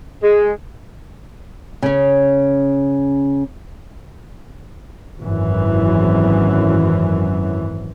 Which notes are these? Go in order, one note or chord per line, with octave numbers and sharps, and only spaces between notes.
G#3
C#3 C#4
G#1 F#2 E3